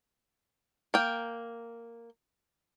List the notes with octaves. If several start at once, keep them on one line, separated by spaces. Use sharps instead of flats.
A#3 G5